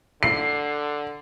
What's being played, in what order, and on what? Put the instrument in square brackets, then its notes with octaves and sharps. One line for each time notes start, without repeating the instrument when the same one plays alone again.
[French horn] D3 [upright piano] C7